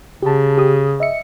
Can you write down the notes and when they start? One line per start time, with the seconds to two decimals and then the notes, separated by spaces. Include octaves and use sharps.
0.23 C#3 G4 A5
0.57 G4 D#6
1.00 D#5 E5 C#7